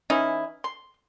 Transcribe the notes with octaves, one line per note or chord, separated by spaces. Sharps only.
E3 C#4 D#4 E4
C6